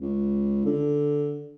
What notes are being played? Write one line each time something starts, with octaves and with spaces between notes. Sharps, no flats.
C#2
D3